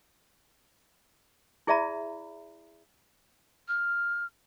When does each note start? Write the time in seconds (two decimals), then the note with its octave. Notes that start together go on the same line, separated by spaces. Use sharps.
1.67 E4 G#4 D5 E5 A#5 B5
3.68 F6